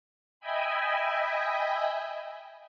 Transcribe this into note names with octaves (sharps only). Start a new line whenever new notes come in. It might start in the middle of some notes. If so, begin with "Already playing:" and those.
D#5 E5 G5 G#5 B5